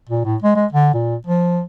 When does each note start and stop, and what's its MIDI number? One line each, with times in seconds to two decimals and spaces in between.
0.09 0.25 46
0.25 0.36 45
0.42 0.54 56
0.56 0.66 56
0.73 0.92 50
0.94 1.16 46
1.27 1.62 53